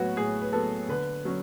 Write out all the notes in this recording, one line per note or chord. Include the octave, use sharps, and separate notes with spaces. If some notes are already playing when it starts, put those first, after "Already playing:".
Already playing: A2 F#3 B3 F#4 B4
A2 G#4
B4
F#3 B3 A4
D3 B4
F#3 C#4